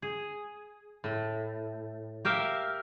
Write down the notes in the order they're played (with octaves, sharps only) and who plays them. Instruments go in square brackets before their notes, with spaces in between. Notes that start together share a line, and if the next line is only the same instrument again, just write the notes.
[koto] G#4
A2
G4 A#4 E5 F5